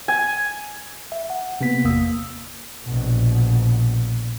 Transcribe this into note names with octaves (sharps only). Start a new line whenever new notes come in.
G#5
E5
F#5
C3 A#3 B3 B6
G#1 E2 A#3 D#6 E6
A#1 B2